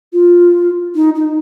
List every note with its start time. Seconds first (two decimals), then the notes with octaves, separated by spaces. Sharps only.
0.13 F4
0.95 D#4
1.15 D#4